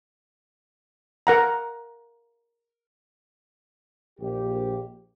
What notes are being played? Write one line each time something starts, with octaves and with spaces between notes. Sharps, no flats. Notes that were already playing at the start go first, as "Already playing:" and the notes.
A#4 F#5 A#5
A#1 G4